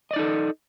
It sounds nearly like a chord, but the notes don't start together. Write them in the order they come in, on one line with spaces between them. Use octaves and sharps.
D#5 D5 D#4 A4